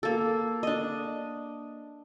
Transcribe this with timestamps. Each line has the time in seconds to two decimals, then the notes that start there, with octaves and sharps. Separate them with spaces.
0.03 A#3 A4
0.63 D4 D#5